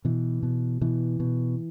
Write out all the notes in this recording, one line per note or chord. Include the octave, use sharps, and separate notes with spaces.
B2 E3
B2
B2 E3
B2